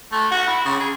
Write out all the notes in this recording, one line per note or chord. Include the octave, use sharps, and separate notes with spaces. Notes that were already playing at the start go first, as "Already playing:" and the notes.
A3
F#4
E4
C#3
G#4